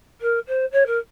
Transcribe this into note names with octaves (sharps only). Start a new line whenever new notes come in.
A#4
C5
C#5
A#4